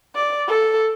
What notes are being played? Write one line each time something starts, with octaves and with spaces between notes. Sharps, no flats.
D5
A4